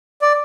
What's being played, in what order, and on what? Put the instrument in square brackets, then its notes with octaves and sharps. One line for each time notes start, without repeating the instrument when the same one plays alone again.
[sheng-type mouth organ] D5